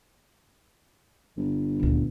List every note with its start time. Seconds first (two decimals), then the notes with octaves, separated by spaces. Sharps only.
1.37 G1
1.80 D#1 D2